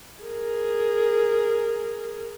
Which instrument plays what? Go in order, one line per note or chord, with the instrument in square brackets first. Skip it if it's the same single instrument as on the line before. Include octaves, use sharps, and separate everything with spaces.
[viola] G#4 A#4